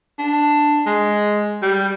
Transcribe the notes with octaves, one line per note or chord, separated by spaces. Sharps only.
D4
G#3
G3